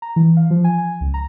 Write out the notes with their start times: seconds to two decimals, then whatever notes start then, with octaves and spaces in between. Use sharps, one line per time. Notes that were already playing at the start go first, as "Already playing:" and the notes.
0.02 A#5
0.16 E3
0.37 F5
0.51 F3
0.64 G#5
0.78 G#5
1.01 C#2
1.14 A#5